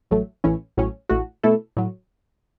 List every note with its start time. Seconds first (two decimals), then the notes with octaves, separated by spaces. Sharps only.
0.11 A1 A2 F#3 A3
0.44 A1 A2 E3 C#4 E4
0.77 A1 A2 F#3 C#4
1.09 A1 A2 A3 F#4
1.43 B2 A3 E4 A4
1.77 A2 F#3